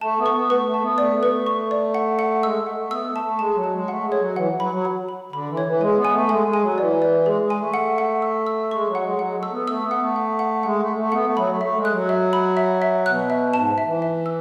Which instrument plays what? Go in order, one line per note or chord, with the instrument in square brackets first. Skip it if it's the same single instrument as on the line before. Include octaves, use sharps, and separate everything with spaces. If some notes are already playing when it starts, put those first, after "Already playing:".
[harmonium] A3 [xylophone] A5
[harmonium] B3
[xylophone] C#6
[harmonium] B3
[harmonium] A3 [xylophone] B4
[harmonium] A3
[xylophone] A5
[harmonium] B3
[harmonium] A3 [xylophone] D5
[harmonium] B3
[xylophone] B4
[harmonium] A3
[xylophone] C#6
D5
F#5
F#5
[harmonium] G#3 [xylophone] E6
[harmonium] A3
[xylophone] F#5
[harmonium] A3
[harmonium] B3 [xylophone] E6
[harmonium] A3
[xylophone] A5
[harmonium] A3
[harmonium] G#3 [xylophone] A5
[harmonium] F#3
[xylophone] A5
[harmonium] G#3
[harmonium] A3 [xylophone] F#5
[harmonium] G#3
[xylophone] C#5
[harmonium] F#3
[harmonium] E3 [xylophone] F#5
[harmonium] F#3 [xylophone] B5
[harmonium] F#3
[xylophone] B5
B5
[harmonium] D3 [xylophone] B5
[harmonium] E3
[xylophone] C#5
[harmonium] E3
[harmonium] G#3 [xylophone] G#5
[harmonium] B3
[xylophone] G#5
[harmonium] A3
[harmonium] G#3 [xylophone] G#5
[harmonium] G#3
[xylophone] G#5
[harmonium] F#3
[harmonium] E3 [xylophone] D5
[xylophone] D5
[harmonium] G#3 [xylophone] G#4
[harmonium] G#3
[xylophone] G#5
[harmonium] A3
[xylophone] F#5
F#5
E6
E6
[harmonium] G#3 [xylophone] C#6
[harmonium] F#3
[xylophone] F#5
[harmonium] G#3
[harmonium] F#3 [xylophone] F#5
[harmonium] G#3
A3
[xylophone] E6
[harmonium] B3
[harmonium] A3 [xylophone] E6
[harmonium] B3
[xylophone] F#5
[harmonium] A3
[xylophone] F#5
F#5
[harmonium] G#3 [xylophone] F#5
[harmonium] A3
[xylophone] F#5
[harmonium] A3
[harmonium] B3 [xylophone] F#5
[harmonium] A3
[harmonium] F#3 [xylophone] B5
[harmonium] A3
[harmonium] A3 [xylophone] E5
[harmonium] G#3
[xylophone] F#6
[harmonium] F#3
[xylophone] E5
B5
E5
E5
[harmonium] B2 [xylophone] F#6
[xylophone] E5
[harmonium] G#2 [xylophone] A5
[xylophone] E5
[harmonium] E3
[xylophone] E5
E6